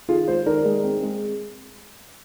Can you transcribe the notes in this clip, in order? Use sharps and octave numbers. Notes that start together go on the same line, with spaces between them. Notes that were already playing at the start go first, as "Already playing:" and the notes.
D#3 F4 G#4
G#3 G#4 C5
D#3 A#4 D5
G#3
C4
G#3